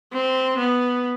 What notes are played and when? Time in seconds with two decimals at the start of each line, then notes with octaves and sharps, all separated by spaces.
0.13 C4
0.59 B3